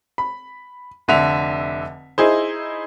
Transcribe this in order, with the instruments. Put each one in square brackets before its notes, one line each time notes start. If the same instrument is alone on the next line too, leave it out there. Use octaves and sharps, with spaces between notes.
[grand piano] B5
F1 D3 E5 F7
D#4 E4 G#4 C5